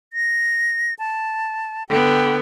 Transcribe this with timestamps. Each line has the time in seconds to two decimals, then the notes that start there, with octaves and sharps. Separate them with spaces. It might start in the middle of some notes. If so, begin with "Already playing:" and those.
0.13 A#6
0.99 A5
1.89 D3 B3 G5